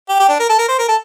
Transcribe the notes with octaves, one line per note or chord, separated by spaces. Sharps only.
G4
G4
D4
A#4
A4
A#4
C5
A#4
A4